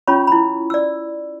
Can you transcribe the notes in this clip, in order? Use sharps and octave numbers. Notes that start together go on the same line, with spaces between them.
C#4 F4 C#5 B5 C#6
E4 B5
D5 E6